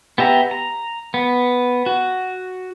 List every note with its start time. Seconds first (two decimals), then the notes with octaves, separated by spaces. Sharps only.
0.18 B3 G4 E5 A#5
0.51 A#5
1.14 B3
1.86 F#4